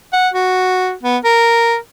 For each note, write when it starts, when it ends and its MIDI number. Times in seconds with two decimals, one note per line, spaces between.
0.13 0.28 78
0.34 0.93 66
1.03 1.17 59
1.24 1.75 70